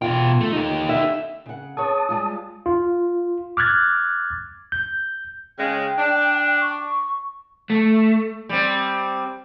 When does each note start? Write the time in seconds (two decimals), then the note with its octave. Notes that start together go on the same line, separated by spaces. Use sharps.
0.02 B2 F4 G5
0.40 A3
0.53 D#4 G4
0.89 E5
1.46 C#3 F#5
1.77 G#4 B4 C#5 A5 D#6
2.09 G3 G#3 F4
2.66 F4
3.57 D6 F6 F#6 G#6 A6
4.72 G6
5.59 C#3 G#3 G5
5.98 D4
6.61 C#6
7.70 A3
8.49 G3 C4